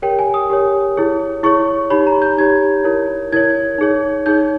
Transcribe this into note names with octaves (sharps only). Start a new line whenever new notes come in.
G4 A#4 C#5 G5
G#5
D#6
G4 A#4 C#5
E4 G#4 C#5
E4 G#4 C#5 C#6
D#4 G4 C#5 B5
A#5
G6
D#4 G4 C#5 G#6
E4 A#4 C#5
E4 A#4 C#5 G#6
D#4 G#4 C#5
D#4 G#4 C#5 G6